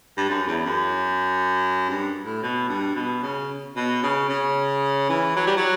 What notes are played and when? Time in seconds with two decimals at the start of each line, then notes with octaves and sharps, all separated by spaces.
0.17 G2
0.29 F#2
0.47 E2
0.65 F#2
1.89 G2
2.25 A2
2.43 B2
2.69 G2
2.95 B2
3.22 C#3
3.76 B2
4.02 C#3
4.29 C#3
5.09 E3
5.36 F#3
5.47 G3
5.57 F#3